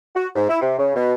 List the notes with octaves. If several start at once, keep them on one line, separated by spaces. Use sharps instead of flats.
F#4
G#2
E4
C3
C#3
B2